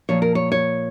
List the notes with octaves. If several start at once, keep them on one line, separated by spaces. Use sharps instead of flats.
A#2 F3 C#5
A#4
C#5
C#5